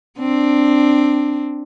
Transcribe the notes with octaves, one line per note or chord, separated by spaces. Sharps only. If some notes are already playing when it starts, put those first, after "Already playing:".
C4 D4